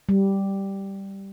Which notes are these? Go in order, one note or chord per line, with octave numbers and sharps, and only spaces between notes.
G3